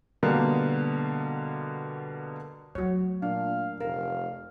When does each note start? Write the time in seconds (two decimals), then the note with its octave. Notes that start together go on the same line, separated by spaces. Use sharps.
0.23 B2 D3 G3 A#3 B3
2.75 F#3 A3 F#4 C#5
3.22 A#2 D4 F5
3.81 F1 A#4 F5